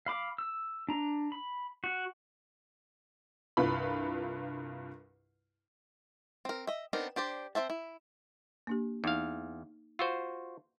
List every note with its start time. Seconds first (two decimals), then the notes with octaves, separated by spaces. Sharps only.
0.06 F5 B5 D6
0.38 E6
0.89 D4 A#5
1.32 B5
1.84 F#4
3.57 C2 G2 F4 B4 B5
6.45 C4 A#4
6.67 D#5 E5
6.93 B3 C4 D4 D#4 A#4
7.16 D4 G4 C5 D5
7.55 C4 C5 E5 A5
7.70 E4
8.67 A#3 D4 G4
9.04 E2 D#4 F5
9.99 F4 F#4 C5 E6